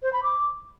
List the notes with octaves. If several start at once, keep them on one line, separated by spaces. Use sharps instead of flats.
C5
B5
D6